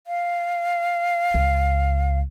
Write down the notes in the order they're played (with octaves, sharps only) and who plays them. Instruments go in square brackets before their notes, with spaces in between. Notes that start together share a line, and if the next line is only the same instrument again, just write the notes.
[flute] F5
[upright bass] C#2